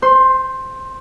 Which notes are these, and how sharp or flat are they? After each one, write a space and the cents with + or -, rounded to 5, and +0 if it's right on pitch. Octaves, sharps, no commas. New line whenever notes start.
C5 -15 C6 +20